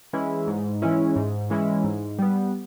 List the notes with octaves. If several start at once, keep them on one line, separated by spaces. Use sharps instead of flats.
E3 G#3 C#4 E4
G#2
E3 G#3 C#4 E4
G#2
E3 G#3 C#4 E4
G#2
G3 B3